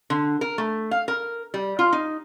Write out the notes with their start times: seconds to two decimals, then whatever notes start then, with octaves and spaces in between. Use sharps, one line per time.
0.10 D3
0.41 A#4
0.58 A3
0.91 F5
1.08 A#4
1.54 G3
1.79 F4
1.93 D#4